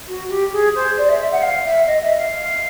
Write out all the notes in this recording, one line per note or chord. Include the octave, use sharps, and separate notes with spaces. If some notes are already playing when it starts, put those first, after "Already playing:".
F#4
G4
G#4
C5
D5
E5
E5
F#5
F5
E5
D#5
E5
F5